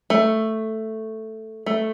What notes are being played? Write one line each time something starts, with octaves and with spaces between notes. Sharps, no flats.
A3
A3